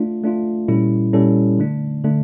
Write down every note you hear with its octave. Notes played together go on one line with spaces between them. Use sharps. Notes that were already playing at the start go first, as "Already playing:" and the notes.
Already playing: A3 D4 F4
A3 D4 F4
A#2 G3 C#4 E4 A4
A#2 G3 C#4 E4 A4
D3 A3 D4
D3 A3 D4